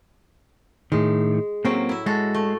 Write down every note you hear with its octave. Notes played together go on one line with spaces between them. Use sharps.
A2 D#3 G#3
A2 F#3 A#3 C4 C#4
E4 E5
G#3 F#4 A4
A3